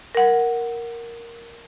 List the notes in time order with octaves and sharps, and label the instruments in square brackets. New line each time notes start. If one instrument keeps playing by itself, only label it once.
[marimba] A#4 F#5